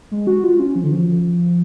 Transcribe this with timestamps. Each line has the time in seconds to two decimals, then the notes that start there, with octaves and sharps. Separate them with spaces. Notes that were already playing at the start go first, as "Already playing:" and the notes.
0.11 G#3
0.27 F#4
0.44 F4
0.60 C#4
0.76 F3
0.84 D3
0.92 F3